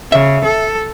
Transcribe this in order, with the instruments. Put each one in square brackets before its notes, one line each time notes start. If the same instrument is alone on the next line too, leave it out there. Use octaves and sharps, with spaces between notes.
[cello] C#3 [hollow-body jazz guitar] E5
[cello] A4